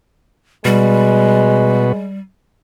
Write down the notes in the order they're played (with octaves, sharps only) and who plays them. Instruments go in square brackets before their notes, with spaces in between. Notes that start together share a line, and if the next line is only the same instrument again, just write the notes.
[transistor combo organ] B2 F#4 B4 [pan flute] G3 [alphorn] G#3